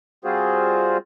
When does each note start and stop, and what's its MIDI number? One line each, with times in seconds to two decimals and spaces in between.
0.24 0.97 55
0.24 0.97 60
0.24 0.97 65
0.24 0.97 66
0.24 0.97 68
0.24 0.97 72